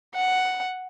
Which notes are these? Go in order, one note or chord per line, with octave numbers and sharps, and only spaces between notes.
F#5